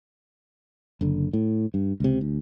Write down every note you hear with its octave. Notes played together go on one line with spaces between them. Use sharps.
F#1 D3
A2
G2
C#2 C3
D2